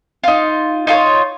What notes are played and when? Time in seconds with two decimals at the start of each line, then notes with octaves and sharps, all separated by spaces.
0.24 D#4 F4
0.87 D#4 F4 A4 C#5